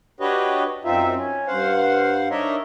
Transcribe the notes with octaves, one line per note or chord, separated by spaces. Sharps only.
D4 F#4 G4 B4 C#5 D#5
F#2 C4 D#4 F4 E5
C#4
G2 C5 F5 F#5
D4 D#4 A#4 C#5 D#5 E5